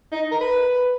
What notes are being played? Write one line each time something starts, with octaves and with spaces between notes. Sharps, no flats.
D#4
A#4
B4